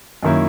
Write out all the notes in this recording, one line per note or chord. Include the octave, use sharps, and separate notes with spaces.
F#2 D#3 A#3 C#4 E4